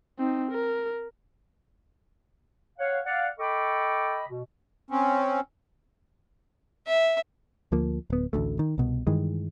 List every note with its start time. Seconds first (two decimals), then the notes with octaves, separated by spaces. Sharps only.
0.19 C4 D#4
0.51 A#4
2.78 C#5 F5 F#5
3.05 D5 F5 F#5
3.39 A4 D#5 G5 B5 C#6 D6
4.27 B2
4.90 C4 C#4
6.87 E5
7.72 D2 F3 A#3
8.10 D1 B3
8.33 A1 D2 A3
8.59 D#3
8.78 C2 B2
9.07 G2 D#3 E3 G#3